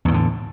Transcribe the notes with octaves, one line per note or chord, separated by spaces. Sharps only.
E2 A2 D3 D#3